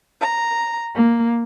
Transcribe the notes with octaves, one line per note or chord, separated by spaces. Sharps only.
A#5
A#3